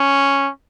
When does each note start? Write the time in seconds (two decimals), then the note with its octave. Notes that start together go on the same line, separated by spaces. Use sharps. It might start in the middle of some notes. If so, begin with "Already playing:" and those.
Already playing: C#4